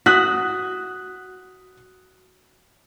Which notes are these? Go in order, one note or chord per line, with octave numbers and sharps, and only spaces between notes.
F#4 D#6 F#6 B6